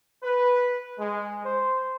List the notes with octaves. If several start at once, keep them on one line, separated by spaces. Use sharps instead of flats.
B4
G#3
C5